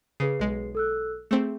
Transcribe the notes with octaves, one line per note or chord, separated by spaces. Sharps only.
C#3 G#4 B4 C7
B1 G#3
A4 E6 F#6
A3 C4 G#4